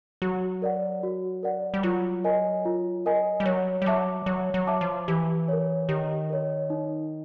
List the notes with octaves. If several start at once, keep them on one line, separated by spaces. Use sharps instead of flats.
F#3 F#4
A#4 D5 F#5
F#4
A#4 D5 F#5
G3
F#3 F4
A#4 D#5 G#5
F4
A#4 D#5 G#5
G3
F#3 C#5
G3
F#3 E5 A5 D6
F#3 C#5
F#3
E5 A5 D6
F3
E3 G4
A#4 C#5
D#3 G4
A#4 C#5
D#4